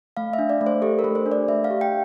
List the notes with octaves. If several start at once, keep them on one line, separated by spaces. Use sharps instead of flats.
A3 F5
E5
D4
D5
A3
C5
G4 A4
A#4
A3
C5
D4
D5
A3 E5
F5
G4
G5